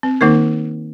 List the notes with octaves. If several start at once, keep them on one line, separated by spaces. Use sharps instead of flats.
C4
D#3 A#3 D#4 A#4